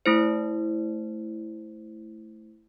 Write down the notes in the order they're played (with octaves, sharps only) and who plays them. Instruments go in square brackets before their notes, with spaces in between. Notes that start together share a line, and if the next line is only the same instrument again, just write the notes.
[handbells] A3 E4 C5